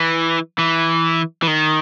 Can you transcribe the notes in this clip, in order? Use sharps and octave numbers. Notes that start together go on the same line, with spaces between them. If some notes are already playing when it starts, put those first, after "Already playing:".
Already playing: E3
E3
E3
D#3